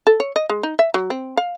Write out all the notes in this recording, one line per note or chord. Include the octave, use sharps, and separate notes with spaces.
A4
C#5
D#5
G#3
D#4
E5
F#3
C4
F5